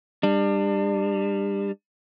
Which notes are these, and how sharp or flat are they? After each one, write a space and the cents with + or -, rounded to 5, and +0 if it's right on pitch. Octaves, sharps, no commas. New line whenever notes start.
G3 +25 D4 +30